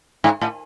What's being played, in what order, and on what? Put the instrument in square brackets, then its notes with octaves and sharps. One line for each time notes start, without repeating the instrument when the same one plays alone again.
[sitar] G#2
A2